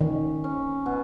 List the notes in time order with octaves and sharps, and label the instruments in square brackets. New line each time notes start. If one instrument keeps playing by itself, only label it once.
[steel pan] D#3 [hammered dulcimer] C#4
[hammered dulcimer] C#4
B2